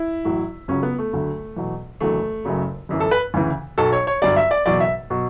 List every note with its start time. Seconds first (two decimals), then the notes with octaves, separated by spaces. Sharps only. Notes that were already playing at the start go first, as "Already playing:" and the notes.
Already playing: E4
0.25 A1 A2 F#3
0.68 C#2 C#3 F#3 C#4
0.83 B3
0.98 A3
1.13 D2 D3 F#3
1.56 E2 B2 F#3
2.00 F#1 E2 D3 F#3 A3
2.45 F#1 F#2 C#3 F#3
2.89 G1 F#2 E3
3.00 A4
3.11 B4
3.34 D2 C#3 E3
3.78 B1 B2 F#3 A4
3.92 C#5
4.07 C#5
4.22 G1 G2 F#3 D5
4.36 E5
4.51 D5
4.66 F#1 E2 B2 F#3 D5
4.80 E5
5.10 B2 F#3